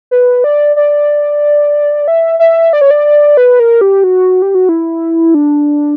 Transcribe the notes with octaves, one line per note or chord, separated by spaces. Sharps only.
B4
D5
D5
E5
E5
D5
C#5
D5
B4
A#4
G4
F#4
G4
F#4
E4
D4